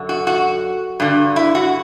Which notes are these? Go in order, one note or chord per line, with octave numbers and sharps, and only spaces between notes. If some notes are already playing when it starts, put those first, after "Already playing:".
Already playing: F#2 D3
F#4
F#4
G2 D3
E4
F#4